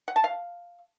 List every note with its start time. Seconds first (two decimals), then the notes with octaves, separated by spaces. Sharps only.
0.08 F#5
0.16 A5
0.24 F5